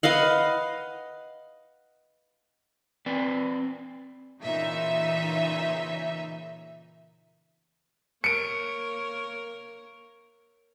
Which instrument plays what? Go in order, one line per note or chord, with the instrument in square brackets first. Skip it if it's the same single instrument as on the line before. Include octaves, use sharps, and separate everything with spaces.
[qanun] B4 D#5 F5 F#5
[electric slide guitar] C4 B4 D5
[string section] A#2 C#3 E3 D#4 E5
[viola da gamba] A#3 A#4 C#5 [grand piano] C#7 D7